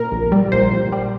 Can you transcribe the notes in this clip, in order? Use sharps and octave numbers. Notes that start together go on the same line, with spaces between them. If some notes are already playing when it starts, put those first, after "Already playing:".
Already playing: A#2 A#4
A#1
G3
A#1 C5
A#1
G3